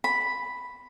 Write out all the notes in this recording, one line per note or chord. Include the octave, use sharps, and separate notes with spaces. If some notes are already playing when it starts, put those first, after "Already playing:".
B5